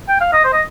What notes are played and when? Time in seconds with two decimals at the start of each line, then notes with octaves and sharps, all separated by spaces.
0.09 G5
0.21 F5
0.33 D#5
0.44 C5
0.53 D#5